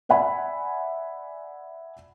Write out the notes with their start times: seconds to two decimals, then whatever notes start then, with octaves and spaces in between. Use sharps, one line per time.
0.09 D5 E5 F#5 G#5 B5